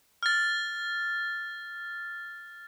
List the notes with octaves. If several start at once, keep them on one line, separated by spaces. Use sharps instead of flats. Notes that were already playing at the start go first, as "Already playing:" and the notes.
F6 A6